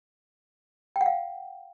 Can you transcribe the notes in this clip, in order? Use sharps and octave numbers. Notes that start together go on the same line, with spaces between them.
G5
F#5
F5